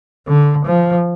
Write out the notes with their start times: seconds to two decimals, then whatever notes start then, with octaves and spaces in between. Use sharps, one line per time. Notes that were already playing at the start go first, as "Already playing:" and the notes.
0.27 D3
0.66 F3